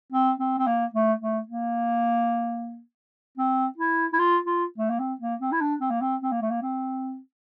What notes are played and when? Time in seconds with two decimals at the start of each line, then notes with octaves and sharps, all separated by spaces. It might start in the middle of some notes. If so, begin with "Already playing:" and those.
0.12 C4
0.39 C4
0.58 C4
0.66 A#3
0.94 A3
1.21 A3
1.48 A#3
3.37 C4
3.77 E4
4.13 E4
4.19 F4
4.45 F4
4.78 A3
4.89 A#3
4.99 C4
5.21 A#3
5.40 C4
5.51 E4
5.61 D4
5.81 C4
5.90 A#3
6.01 C4
6.22 C4
6.31 A#3
6.41 A3
6.50 A#3
6.62 C4